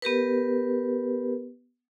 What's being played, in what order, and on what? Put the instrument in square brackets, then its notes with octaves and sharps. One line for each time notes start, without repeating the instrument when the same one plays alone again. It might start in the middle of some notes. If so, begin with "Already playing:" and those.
[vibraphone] B3 G4 A#4 B4